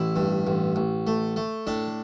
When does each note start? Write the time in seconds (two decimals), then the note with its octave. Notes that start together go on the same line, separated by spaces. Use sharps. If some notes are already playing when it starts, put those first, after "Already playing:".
Already playing: A1 E4
0.16 G2
0.47 A1
0.76 A1
1.07 A3
1.36 A3
1.67 A2 D4